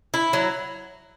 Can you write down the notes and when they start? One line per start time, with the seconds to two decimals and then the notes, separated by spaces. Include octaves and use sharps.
0.14 E4
0.33 F#3